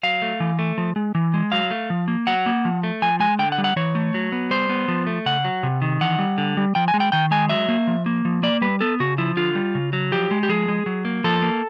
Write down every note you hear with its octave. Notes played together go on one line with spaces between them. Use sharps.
F#3 F5
A3
E3
A3
F3
G#3
E3
G#3
F#3 F5
A3
F3
A#3
F#3 F#5
A#3
F3
A3
F3 G#5
G#3 G#5
D3 G5
F#5
G3
F#5
E3 C#5
A3
F#3
B3
G3 C5
B3
F3
A3
C#3 F#5
F#3
C3
D#3
E3 F#5
G3
D3
G3
F3 G5
G#5
G#3
G5
D#3 G5
G#3 G#5
F#3 E5
A#3
F3
A#3
F3
A#3 D5
G3 B4
B3 A4
C#3 F#4
F3 E4
D3 F4
G3
C#3
F#3
F3 G4
G#3
G4
F3 G#4
G#3
F#3
A#3
F3 A4
A#3